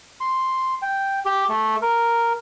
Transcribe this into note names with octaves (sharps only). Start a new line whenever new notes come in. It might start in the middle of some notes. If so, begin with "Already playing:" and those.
C6
G5
G4
A3
A#4